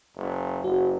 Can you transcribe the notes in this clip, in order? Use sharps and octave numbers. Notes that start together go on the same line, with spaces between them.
F#1
F#1 F#4